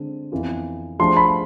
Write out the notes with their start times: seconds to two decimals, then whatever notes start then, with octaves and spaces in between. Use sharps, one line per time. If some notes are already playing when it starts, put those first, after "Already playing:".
Already playing: D3 G#3 C4
0.32 F2 E3 B3 F4
0.99 F3 A3 D4 G#4 C6
1.17 B5